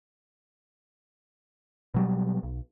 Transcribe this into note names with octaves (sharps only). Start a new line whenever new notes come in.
B2 F#3 G3
B1